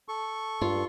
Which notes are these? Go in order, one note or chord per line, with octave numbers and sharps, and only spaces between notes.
A4 C#6
G2 F4